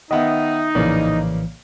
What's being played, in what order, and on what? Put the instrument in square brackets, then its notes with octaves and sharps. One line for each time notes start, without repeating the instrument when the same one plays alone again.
[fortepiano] D#3 B3 [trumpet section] D#4 [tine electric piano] D#5 E5
[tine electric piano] A#1 A2 E3 [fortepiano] C#3 A#3 D5